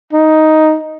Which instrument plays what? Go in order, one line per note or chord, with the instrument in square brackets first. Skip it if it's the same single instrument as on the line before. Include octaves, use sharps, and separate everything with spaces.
[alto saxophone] D#4